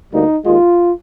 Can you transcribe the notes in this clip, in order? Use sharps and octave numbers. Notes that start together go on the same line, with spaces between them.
D2 D3 G3 A#3 D#4
D#2 D#3 G#3 F4